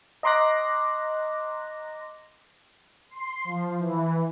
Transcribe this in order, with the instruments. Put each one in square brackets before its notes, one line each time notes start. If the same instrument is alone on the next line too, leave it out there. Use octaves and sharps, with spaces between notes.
[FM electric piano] D#5 A#5 C6 D6 F#6 A#6
[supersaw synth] C6
F3
E3